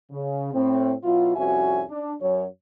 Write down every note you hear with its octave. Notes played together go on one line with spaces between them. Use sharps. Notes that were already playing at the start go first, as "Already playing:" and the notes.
C#3
A2 C4
B2 F#3 E4 F4
C2 F2 C#4 F#4 E5 G#5
D4
F#2 C#5